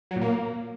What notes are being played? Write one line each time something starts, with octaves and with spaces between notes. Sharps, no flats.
F#3
A#2
A#3